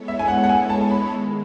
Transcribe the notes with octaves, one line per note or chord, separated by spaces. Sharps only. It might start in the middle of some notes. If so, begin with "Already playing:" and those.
Already playing: G#3 B3 E4 A4 C#5
E5
G#5
F#5
F#5
G#5
A5
B5
D#3 G#3